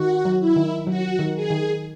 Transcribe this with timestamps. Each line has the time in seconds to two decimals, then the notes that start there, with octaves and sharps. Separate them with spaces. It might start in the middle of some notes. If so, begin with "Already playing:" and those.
Already playing: D#3 F#4
0.25 F#3
0.40 E4
0.56 D#3
0.87 F#3 F#4
1.19 D#3
1.36 G#4
1.50 D#3